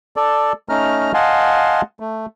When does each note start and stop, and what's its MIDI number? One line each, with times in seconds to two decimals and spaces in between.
0.16 0.53 69
0.16 0.53 74
0.69 1.12 57
0.69 1.12 61
0.69 1.12 63
0.69 1.12 82
0.69 1.12 89
1.14 1.82 75
1.14 1.82 77
1.14 1.82 78
1.14 1.82 80
1.14 1.82 81
1.14 1.82 84
2.00 2.26 57